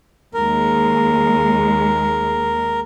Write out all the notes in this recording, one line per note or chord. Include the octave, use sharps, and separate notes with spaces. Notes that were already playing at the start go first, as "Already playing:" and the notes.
D#2 G#3 A#4